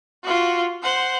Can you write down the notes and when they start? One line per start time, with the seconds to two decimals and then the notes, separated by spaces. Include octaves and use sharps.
0.23 F4 F#4
0.83 C5 F#5